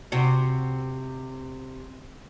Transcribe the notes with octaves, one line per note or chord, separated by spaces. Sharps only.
C3 F#4